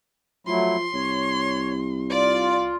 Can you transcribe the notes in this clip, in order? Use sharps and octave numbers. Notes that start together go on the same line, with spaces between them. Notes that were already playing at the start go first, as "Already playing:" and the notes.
F3 F#3 A3 E4 C6
C2 C#5
F4 D5